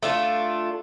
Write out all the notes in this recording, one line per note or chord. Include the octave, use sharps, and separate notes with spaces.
A3 D4 F4